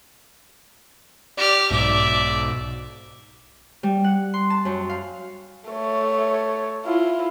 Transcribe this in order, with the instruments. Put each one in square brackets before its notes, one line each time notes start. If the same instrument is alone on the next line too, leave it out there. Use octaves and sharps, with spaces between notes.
[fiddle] G4 F6 [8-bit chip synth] D5
[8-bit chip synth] B1 G#2 B2 [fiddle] D5 E5
[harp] G3
F#5
C6
A5
F#2
F5
[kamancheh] A3 C#5
E4 F4